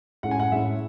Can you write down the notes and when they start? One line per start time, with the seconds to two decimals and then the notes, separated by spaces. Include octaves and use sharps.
0.23 A2 G#3 C#4 E4 F#5
0.31 G#5
0.40 F#5
0.52 A2 G#3 C#4 E4 E5